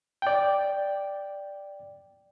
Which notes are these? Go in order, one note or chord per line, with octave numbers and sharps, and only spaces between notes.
D5 G5